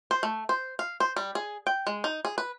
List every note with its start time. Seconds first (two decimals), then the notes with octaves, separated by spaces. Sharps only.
0.11 C5
0.23 A3
0.49 C5
0.79 F5
1.00 C5
1.16 G3
1.35 G#4
1.67 G5
1.87 G#3
2.04 D#4
2.25 G#4
2.38 B4